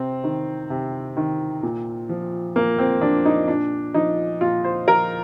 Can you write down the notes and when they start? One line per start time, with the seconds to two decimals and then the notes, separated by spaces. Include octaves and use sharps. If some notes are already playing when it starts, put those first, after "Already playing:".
Already playing: C3 C4
0.24 D#3
0.70 C3
1.17 D#3
1.63 A#2
2.09 F3
2.56 A#2 A#3
2.79 C4
3.01 F3 D4
3.25 D#4
3.48 A#2 D4
3.94 F3 D#4
4.41 A#2 F4
4.64 C5
4.87 F3 A#4